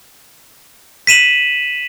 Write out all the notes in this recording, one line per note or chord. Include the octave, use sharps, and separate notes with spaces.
B6 D#7 E7 F#7